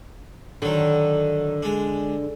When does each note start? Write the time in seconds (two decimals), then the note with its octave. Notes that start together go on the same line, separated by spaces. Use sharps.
0.62 D3 D#3 F#3
1.63 G#3 D4